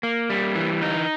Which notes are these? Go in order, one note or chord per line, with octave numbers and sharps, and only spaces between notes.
A#3
G3
E3
D#4